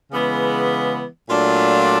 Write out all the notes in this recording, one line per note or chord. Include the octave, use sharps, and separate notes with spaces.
C#3 E3 G#3 B3
A#2 F#3 A3 D4 F4